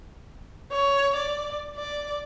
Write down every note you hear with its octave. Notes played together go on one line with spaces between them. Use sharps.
C#5
D5
D5